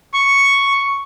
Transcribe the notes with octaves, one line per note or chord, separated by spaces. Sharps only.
C#6